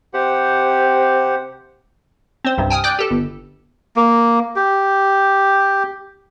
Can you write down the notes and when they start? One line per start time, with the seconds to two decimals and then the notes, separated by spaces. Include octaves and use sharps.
0.14 C3 G4 C5 F#5
2.44 C4 C5
2.58 C2 G2 C3
2.70 G5 G#5 D#6 F6
2.84 D5 G5 D6 F#6 G6
2.99 G4 A4
3.11 G1
3.96 A#3
4.56 G4